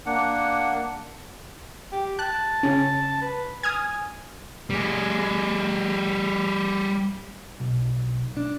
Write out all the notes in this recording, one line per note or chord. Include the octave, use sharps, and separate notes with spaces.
A#3 D4 F#5
G4
A5 F#6
C#3 C#4
B4
G#5 D#6 F6 G#6
G3 G#4
B1
D4